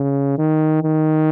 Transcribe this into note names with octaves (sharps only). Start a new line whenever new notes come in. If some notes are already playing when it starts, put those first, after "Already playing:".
Already playing: C#3
D#3
D#3